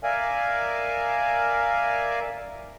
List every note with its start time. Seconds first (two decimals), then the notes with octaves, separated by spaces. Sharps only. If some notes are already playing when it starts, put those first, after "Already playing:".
0.03 A#4 D5 E5 F5 G#5